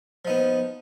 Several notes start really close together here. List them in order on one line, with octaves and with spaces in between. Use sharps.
F3 D#4 B3